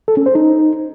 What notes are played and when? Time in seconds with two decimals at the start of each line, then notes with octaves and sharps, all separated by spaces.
0.08 A4
0.17 C#4
0.26 C5
0.35 D#4